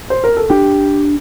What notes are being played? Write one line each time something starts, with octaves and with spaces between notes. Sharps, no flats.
C5
A#4
A4
D4 G4